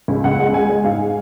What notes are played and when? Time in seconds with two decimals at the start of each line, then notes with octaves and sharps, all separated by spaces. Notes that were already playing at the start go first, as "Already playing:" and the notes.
0.08 C#2
0.24 C#2 F#5
0.39 G#3
0.53 G#3 G#5
0.69 G#3
0.84 G#2 F5
0.99 G#3